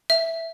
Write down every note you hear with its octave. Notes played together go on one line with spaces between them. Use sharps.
E5